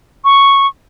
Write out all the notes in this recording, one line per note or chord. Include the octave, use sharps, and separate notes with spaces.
C#6